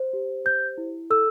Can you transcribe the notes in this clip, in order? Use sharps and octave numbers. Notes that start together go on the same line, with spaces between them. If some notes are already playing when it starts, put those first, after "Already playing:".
Already playing: C5
G4
C5 G6
E4
A4 E6